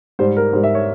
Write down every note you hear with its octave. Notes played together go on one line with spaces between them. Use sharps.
G#2 G3 C5
A#4
G#2 G3 C5
E5
C#5